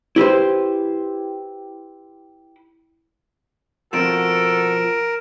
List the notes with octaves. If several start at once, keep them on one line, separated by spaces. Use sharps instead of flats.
E4 G4 B4 C5
B2 F3 C4 F#4 A4 A#4 D7 E7